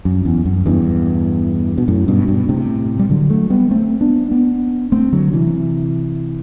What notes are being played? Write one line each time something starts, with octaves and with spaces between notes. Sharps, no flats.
F#2
E2
F#2
E2 G2
B2
F#2 A2
G2 B2
G2 B2
A2 C3
G3
D3 F#3
F#3 A3
G3 B3
A3 C4
B3 D4
B3 D4
A3 C4
D3 F#3
C3 E3